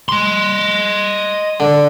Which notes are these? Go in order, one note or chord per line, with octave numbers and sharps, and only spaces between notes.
D#5 C6
D3